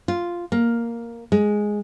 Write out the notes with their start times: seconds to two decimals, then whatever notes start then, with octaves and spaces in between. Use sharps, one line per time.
0.08 F4
0.52 A#3
1.32 G#3